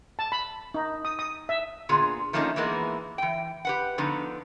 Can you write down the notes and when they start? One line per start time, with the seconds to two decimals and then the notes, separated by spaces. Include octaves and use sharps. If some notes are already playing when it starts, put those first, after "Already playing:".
0.19 A5
0.32 B5
0.74 D#4
1.05 D#6
1.19 D#6
1.49 E5
1.89 A#2 D3 B3 F4 G#4
2.33 D#3 F3 A3 A#3 C#4 D#4
2.56 E3 G#3 A#3 B3
3.18 E3 G5
3.65 G4 B4 F#5
3.98 D3 F3 B3 D#4